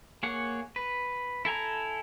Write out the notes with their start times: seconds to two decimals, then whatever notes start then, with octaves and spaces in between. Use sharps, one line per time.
0.23 A#3 G#4 C#5 F#5
0.76 B4
1.45 E4 A4 G#5 A#5